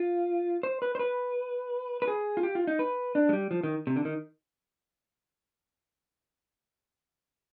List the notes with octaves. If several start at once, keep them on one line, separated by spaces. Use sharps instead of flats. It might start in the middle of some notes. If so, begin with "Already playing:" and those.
Already playing: F4
C5
B4
C5
B4
B4
G#4
F4
G4
F4
D#4
B4
D4
G#3
G3
F3
D#3
C3
D3
D#3